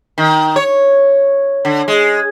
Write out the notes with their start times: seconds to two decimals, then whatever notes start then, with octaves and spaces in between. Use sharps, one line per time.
0.18 D#3
0.56 C#5
1.65 D3
1.88 G#3